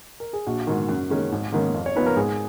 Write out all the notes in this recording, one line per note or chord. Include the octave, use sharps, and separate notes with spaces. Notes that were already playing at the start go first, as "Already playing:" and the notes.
A#4
G#4
A#1 F#4
G#2 D#3
F#2
D#3 G#3 C#4
G#1
G#2 D#3 A#3 C#4
F2
C#5
F3 B3 D#4 B4
A#4
G#1 G#4